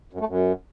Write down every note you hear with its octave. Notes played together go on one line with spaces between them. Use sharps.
F#2
A3
F#2